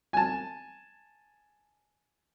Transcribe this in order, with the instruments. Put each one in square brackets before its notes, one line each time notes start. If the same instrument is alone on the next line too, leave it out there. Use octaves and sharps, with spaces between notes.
[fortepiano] G#5 A5